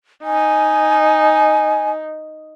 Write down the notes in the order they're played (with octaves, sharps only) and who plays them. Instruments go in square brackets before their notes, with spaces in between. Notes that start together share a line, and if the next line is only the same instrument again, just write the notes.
[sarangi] D#4 [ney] G#5